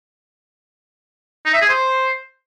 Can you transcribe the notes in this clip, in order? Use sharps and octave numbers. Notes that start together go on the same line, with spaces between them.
D#4
E5
G#4
C5